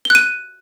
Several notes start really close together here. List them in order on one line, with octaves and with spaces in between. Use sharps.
G7 F#6 D#7